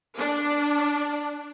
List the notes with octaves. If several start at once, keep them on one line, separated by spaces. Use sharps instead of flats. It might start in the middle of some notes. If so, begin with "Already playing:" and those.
D4